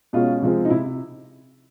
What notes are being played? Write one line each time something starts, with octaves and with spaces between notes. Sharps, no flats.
B2 G#3 C#4 F4
C3 F3 G#3 C4
D#4
C3 E4